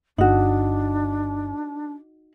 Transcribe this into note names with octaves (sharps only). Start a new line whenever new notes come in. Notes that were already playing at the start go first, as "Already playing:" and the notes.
G1 D4 D#4 F#4